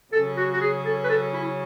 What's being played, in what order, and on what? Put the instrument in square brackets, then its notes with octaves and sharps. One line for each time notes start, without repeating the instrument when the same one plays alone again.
[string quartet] C#3 F#3 C#4 [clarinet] A4
[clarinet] F#4
F#4
G#4
A4
B4
A4
E4